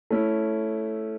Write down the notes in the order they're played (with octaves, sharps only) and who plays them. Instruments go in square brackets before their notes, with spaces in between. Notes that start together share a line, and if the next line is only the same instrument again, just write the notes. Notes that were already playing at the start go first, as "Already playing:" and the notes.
[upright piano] A3 C#4 E4